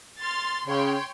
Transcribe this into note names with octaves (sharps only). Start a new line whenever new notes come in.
C6 F6 A6
C#3 C#5 G5 C6